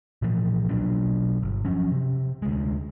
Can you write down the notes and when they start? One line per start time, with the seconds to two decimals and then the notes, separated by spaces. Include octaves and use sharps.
0.22 A#2 E3 F3
0.69 B2 F#3 D4
1.43 G1
1.65 F3 F#3 C#4
1.92 C3
2.42 D2 G#3